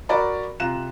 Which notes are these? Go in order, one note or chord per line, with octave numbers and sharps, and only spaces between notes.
F#4 A#4 C#5 D5 A#5 B5
C3 F4 A#5 F#6 E7